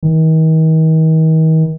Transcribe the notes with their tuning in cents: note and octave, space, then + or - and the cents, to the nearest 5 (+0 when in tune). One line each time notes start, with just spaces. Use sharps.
D#3 +40